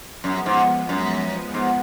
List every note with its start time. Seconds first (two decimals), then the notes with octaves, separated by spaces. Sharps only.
0.24 F#2 F3 G#3 B3
0.46 G#2
0.89 F#2
1.54 G#2